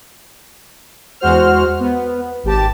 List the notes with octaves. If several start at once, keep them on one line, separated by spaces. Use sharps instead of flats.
E2 G#3 F#4 C5 F6
B3
G#1 G4 A5